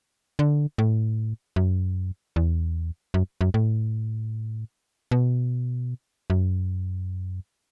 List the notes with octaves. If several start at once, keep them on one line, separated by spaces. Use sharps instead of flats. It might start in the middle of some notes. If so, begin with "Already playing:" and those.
D3
A2
F#2
E2
F#2
F#2
A2
B2
F#2